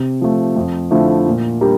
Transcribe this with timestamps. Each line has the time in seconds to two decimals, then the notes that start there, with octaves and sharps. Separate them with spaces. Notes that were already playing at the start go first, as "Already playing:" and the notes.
Already playing: C3
0.21 F3 A3
0.56 F2
0.91 D3 F3 A3 E4
1.26 A#2
1.61 G3 D4 G4 A#4